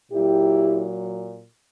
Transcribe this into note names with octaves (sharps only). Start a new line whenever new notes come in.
A#2 F#3 E4 G4